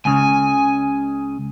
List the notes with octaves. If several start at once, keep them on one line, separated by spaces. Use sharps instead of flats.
C#2 C#3 G#5